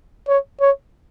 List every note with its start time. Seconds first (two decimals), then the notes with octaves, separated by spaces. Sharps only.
0.28 C#5
0.61 C#5